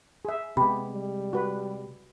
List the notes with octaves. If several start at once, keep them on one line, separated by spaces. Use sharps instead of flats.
G#4 E5
C3 G#3 B3 G4 B5
G3
F#4 B4